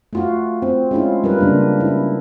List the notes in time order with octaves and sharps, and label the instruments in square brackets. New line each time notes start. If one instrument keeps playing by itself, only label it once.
[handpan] A3 F4 F#4
C4
G#3 C#4 E4 F4
G3 F4 A#4 B4
C#3 A#3 D4
E4